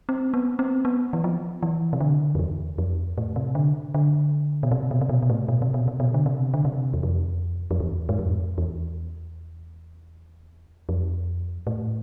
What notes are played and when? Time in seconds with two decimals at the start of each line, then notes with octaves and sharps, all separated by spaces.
0.09 C4
0.34 B3
0.59 C4
0.85 B3
1.13 E3
1.24 F3
1.63 E3
1.93 C3
2.01 D3
2.35 F2
2.39 E2
2.78 F2
3.18 A2
3.36 C3
3.55 D3
3.94 D3
4.63 B2
4.72 C3
4.91 B2
5.01 C3
5.09 B2
5.23 B2
5.30 A2
5.48 B2
5.62 C3
5.74 B2
5.88 C3
6.00 B2
6.14 D3
6.26 C3
6.54 D3
6.65 C3
6.94 E2
7.03 F2
7.71 F2
7.80 E2
8.09 G#2
8.19 F2
8.58 E2
10.89 F2
11.67 A2